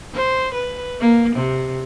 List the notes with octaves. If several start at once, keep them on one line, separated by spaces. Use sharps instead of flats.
C5
B4
A#3
C3